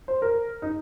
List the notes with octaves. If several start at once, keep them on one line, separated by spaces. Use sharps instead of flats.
C5
A#4
D#4